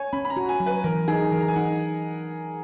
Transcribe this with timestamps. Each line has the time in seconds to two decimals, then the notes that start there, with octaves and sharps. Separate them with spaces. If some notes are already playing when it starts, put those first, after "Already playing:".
Already playing: C#5 G#5
0.13 C#4 B5
0.25 B5
0.30 A#5
0.37 F#4
0.49 G#5
0.60 F#3
0.66 B4
0.84 E3 A#4
1.08 D#4 G#4
1.32 E3 A#4
1.41 A#5
1.48 G#5
1.56 D#4 F#5